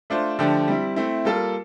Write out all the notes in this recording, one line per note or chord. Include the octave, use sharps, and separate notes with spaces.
A3 D4 F4 C5
D3 F3 A3 D4 G4
G3 C4 E4
A3 C4 E4
G3 A#3 F4 A4